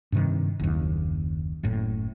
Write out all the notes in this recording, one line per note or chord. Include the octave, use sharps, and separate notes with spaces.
G2 C3 D#3
F#1 D#2
F#1 A2